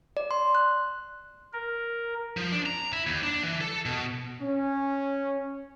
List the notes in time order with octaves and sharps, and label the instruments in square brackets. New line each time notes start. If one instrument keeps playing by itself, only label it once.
[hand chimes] D5
C6
F#6
[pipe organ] A#4
[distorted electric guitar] F3
D4
A#5
E4
D#2
D4
E3
A4
B2
[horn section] C#4